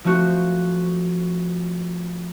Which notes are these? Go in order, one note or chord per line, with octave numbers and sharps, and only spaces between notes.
F3 A3 C4 F#4